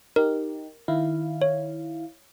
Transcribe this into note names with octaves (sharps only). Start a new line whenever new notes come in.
D#4 G4 A#4
D#3 E4 F5
C#5